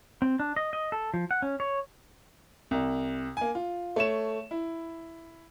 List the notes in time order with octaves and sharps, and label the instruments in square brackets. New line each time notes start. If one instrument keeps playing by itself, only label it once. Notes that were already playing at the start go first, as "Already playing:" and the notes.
[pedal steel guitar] C4
D4
D#5
D#5
A4
F3
F#5
C#4
C#5
[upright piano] C2
A#3 G#5
F4
A3 C#5 E7
E4